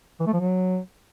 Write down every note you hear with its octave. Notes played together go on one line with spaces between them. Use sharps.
E3
A3
F3
F#3